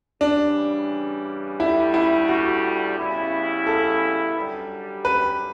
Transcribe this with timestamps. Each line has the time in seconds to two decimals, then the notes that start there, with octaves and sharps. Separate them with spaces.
0.21 C#3 E3 G3 D4
1.59 D2 D3 G3 E4
1.94 E4
2.28 F#4
2.97 C#3 G3 B3 E4
3.66 A4
4.36 F#2 D3 G3
5.05 B4